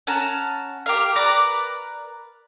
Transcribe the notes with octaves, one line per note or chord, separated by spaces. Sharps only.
C#4 F#5 A5 A#5
G4 A#4 F5
A#4 B4 D5 A#5